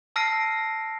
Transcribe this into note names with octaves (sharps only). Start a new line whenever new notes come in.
A5 E6 F6 A#6 C7 D7